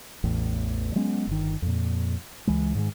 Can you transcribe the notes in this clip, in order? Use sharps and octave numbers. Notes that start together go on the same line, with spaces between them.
A1 E2 A2
F#3 G#3 B3 C#4
G1 D#3
F2 A#2
C#2 E3 G#3
G#2 D#3 G#3